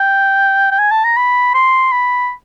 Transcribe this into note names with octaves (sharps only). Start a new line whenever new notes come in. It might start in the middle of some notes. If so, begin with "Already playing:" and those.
Already playing: G5
G5
G#5
A5
A#5
B5
C6
B5